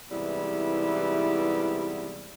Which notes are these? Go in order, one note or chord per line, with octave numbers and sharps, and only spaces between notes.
G#2 C3 E3 G3 B3 E4